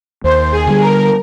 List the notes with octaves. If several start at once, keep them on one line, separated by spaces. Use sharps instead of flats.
D#2 C5
G#4
D3 G3
A#4